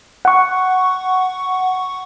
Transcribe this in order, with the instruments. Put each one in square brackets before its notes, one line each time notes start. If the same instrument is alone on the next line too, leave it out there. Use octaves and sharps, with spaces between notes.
[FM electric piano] F#5 C#6